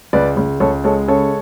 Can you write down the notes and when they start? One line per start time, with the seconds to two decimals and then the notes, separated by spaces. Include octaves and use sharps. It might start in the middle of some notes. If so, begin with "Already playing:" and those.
0.13 C#2 B4 D5
0.37 C#2
0.60 C#2 A4 C#5
0.84 G#3 A4 C#5
1.08 C#3 A4 C#5